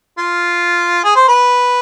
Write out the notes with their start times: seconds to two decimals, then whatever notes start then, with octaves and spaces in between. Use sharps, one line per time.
0.18 F4
1.04 G#4
1.16 C5
1.28 B4